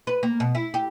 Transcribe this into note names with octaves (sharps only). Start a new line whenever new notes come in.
B4
A#3
B2
E4
G4